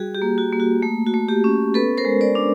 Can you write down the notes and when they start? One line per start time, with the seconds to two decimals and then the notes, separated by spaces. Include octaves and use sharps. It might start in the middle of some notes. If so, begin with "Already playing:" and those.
Already playing: G3 F#4 G#4
0.15 G4
0.22 A#3
0.38 F#4
0.52 A#3
0.60 F#4
0.82 A3
1.07 F#4
1.14 A3
1.29 G4
1.44 C#4
1.74 B3 A4 B4
1.98 A#4 C5
2.05 G#3
2.21 C5 D5
2.35 D4